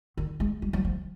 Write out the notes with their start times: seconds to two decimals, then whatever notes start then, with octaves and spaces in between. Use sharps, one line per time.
0.17 D#3
0.40 G#3
0.62 G3
0.73 F#3
0.85 F3